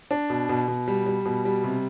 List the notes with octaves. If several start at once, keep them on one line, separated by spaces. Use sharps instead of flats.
D4
B2
B2
B2
G3
G3
B2
G3
C3